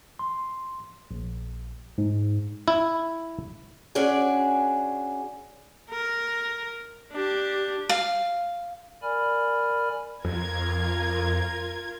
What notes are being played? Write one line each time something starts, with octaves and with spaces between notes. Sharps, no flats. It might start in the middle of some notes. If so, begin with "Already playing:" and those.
C6
A#1
G#2
E4
C#4 D4 F#4 G#4 D5
A#4
D4 G4
F5
A#4 D5 G#5 B5 F6
F2 F4 A#4 G#6